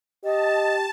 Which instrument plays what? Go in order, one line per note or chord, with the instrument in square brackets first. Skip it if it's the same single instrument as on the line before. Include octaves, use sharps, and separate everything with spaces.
[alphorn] G4 [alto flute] D#5 [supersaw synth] A5